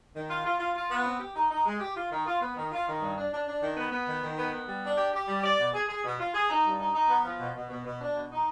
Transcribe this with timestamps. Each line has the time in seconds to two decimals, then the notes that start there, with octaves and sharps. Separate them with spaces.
0.15 D#3
0.29 F4
0.45 F4
0.59 F4
0.75 F4
0.91 B3
1.05 C4
1.20 G4
1.36 D#4
1.51 D#4
1.66 G#3
1.80 G4
1.96 F4
2.11 D#3
2.26 F4
2.41 B3
2.56 D#3
2.71 F4
2.87 D#3
3.01 G2
3.16 D4
3.32 D4
3.47 D4
3.62 D#3
3.77 B3
3.92 B3
4.07 D#3
4.23 D#3
4.38 B3
4.52 B3
4.68 G3
4.83 D4
4.98 G4
5.13 G4
5.28 G3
5.43 D5
5.59 B2
5.74 G#4
5.88 G#4
6.03 B2
6.19 F4
6.33 G#4
6.49 D#4
6.64 G2
6.79 D#4
6.94 D#4
7.09 B3
7.24 F3
7.39 B2
7.55 B2
7.70 B2
7.85 B2
8.01 D4
8.15 B2
8.31 D#4